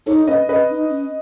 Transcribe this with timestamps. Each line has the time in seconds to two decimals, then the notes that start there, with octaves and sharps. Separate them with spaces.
0.06 D#4 A4 C#5
0.27 C#4 B4 D#5
0.49 C#4 B4 D#5
0.70 D#4
0.90 C#4